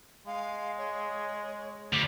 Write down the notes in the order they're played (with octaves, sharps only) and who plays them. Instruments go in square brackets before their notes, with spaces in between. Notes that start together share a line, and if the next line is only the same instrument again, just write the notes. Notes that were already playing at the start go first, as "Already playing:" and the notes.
[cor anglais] G#3 [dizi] F5
[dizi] C#5
[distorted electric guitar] D2 [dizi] D6